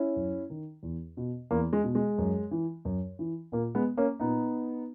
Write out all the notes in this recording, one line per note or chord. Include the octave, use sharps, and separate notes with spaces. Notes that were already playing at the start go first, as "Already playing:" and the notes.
Already playing: C#4 E4
F#2
D#3
E2
B2
E2 A#3
G#3
B2
G#3
F#2
E3
F#2
E3
A#2 A#3
G#3 B3
A#3 C#4
A#2 B3 D#4